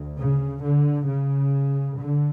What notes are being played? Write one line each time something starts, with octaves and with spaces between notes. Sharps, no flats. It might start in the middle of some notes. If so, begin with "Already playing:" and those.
Already playing: D2
C#3
D3
C#3
D3